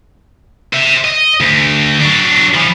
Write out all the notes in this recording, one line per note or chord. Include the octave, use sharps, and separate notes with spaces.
C5 E5
D#5
D2
F#3 D4
E3 F3